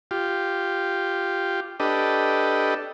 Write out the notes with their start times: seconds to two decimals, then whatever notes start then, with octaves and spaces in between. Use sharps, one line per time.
0.11 F4 G4
1.80 D4 G4 A4 B4 D#5